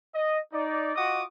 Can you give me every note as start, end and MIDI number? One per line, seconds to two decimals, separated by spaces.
0.15 0.39 75
0.53 0.94 63
0.53 0.94 74
0.96 1.23 65
0.96 1.23 66
0.96 1.23 75
0.96 1.23 78
0.96 1.23 86
0.96 1.23 87